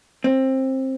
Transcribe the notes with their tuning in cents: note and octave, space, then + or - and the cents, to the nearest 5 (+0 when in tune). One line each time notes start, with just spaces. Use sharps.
C4 +20